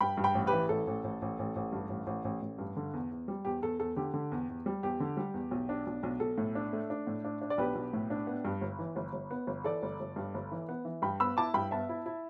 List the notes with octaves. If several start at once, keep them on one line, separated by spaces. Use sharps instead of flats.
G2 G5 B5
G2
G5 B5
A1
G4 B4
E3
A1 A4
A1
A1
A1
A1
A1
G2
A1
A1
A1
A1
G2
D3
E2
E2
G3
E2 G4
E2 A4
E2 A4
D3 G4
D3
E2
E2
G3
E2 G4
D3
G3
E2
B1
D4
B1
B1
B1 A4
A2
D4
A3
D4
A2
D4
D4
D5
B1 G4 B4
B1
A2
D4
B3
G2
G1
E3
G1
G1
B3
G1
E3 A4 D5
G1
G1
G2
G1
E3
B3
E3
G2 G5 B5
B3 B5 E6
E4 A5 D6
G2 G5 B5
B3 E5 A5
E4
E4